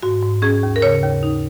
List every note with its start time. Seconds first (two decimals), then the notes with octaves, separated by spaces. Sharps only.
0.03 G#2 F#4
0.23 G#2
0.42 C#4 G#4
0.63 D#2
0.76 A#4
0.82 C#3 C#5
1.03 D#2
1.23 D#4